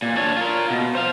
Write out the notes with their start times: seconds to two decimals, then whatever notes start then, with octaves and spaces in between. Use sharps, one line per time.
0.02 A#2
0.16 D4 C#5
0.37 F4 A#4
0.70 B2
0.95 C5 F5